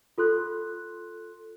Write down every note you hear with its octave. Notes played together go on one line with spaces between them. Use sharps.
F4 A4 C6 F#6